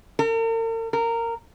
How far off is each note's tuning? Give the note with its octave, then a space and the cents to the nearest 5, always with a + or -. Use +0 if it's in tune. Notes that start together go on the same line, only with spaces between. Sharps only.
A#4 -45
A#4 -15